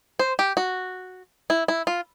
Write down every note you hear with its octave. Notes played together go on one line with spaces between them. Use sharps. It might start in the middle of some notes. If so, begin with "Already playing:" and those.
C5
G4
F#4
E4
E4
F4